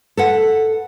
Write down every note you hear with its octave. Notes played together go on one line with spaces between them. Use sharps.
A4 B4 F#5